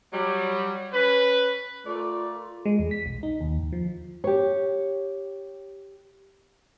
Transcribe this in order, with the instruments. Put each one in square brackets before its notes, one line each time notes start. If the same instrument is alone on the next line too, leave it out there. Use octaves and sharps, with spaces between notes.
[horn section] F#3 G3
C#4 B4
[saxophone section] A3 A#4 D5 [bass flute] F4
[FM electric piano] G#3
E2
B6
B1
D#4
D#2
D#2
F3
[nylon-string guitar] G4 C#5